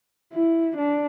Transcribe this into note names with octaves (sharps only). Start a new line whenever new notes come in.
E4
D4